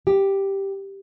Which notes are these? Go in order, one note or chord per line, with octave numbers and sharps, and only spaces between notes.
G4